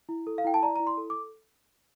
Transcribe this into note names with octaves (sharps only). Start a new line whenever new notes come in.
E4
A4
F5
E4 G5
A5
D5 A#5
E4 A#5
C6
A4
D6